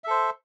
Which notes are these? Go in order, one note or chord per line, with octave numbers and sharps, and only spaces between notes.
A4 C5 E5